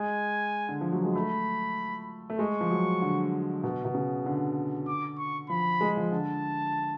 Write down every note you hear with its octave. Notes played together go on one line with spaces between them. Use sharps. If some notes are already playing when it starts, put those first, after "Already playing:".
Already playing: G#3 G#5
D3
F3
F#3
G#3
A3 B5
A3
G#3 C#6
F3
F#3
D3
B2
B2
C#3
D3
D6
C#6
F3 B5
G#3
F3
D3 A5